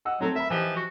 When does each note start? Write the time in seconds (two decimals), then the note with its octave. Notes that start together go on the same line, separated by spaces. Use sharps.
0.05 D#5 F#5 E6
0.21 F#3 A3 C4
0.36 A#4 E5 B5
0.50 E3 F3 G4 D#5
0.76 F#4